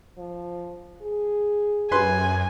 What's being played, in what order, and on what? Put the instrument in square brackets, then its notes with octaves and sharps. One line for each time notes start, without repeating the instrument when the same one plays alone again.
[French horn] F3
G#4
[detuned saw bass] F#2 [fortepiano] B4 C6 [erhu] G#5